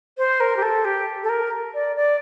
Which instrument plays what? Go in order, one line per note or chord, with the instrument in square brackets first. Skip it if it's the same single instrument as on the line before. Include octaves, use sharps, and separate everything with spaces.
[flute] C5
A#4
G4
A4
G4
A4
A#4
D5
D5